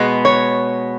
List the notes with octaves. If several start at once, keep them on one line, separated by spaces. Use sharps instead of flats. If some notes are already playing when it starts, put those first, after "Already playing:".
Already playing: B2 G#3 B3
C#5